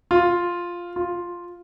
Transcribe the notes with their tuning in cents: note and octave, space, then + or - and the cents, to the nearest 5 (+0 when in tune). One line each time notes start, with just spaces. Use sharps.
F4 +0
F4 +0